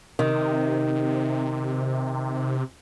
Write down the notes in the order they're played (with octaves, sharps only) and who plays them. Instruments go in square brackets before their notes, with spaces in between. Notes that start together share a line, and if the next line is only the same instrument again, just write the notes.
[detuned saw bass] C3 [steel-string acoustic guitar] D#3